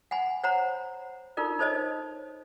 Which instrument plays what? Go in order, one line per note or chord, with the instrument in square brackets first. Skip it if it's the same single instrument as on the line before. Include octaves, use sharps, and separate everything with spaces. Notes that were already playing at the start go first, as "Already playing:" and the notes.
[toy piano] F#5 G#5 B5
C5 C#5 F#5 A#5 B5
D#4 F4 A4 A#4 D5
D#4 A4 C5 C#5 D#5 A5